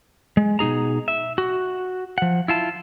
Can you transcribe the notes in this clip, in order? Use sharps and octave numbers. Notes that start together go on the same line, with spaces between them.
G#3
B2 D#4 G#4 A#5
E5
F#4
F3 F#5
E4 F4 A5